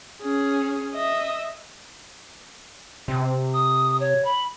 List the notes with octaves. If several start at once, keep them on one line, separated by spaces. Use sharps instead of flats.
C#4 G#4
D#5 E5
C3
D#6
C#5
B5